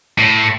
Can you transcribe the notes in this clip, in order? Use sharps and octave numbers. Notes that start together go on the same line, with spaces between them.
A2